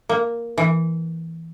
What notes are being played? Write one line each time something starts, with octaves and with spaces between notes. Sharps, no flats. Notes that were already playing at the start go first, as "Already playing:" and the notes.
A#3
E3